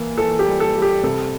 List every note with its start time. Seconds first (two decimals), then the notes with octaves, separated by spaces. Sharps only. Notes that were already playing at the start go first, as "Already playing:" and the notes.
Already playing: E3 A#3
0.18 E3 A4
0.39 G4
0.46 G3
0.60 A4
0.76 G3
0.82 G4
1.03 C3 A4